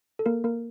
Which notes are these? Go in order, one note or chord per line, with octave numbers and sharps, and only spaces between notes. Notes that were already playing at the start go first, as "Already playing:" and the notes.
A4
A#3 A#4
A#3 A#4